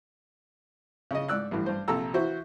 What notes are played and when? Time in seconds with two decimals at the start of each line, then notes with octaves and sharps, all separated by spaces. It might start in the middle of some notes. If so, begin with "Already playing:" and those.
1.11 C#3 D#5
1.28 G#2 D5 E6 F#6
1.51 A1 G2 E3
1.66 G2 C5
1.88 A#1 C3 A4 A#5 E6
2.14 E3 E4 F#4 C5 E5